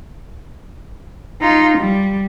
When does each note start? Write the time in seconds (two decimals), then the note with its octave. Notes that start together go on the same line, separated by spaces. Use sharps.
1.41 D#4 F4
1.78 G3